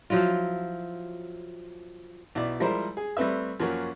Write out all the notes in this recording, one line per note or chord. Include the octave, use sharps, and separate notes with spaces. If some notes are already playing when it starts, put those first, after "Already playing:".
F3 F#3 E4 F4
B1 E4 D5
F3 G3 G#3 E4 A#4 C5
G#4
G3 A3 C4 B4 E5
F#2 F3 F#3 A#3 C#4